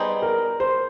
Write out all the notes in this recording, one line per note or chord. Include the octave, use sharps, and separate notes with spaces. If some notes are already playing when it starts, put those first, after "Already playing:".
Already playing: G3 B3 D#4 G#4 C5
A#4
C5